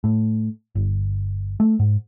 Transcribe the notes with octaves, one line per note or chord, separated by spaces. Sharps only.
A2
G1
A3
G#2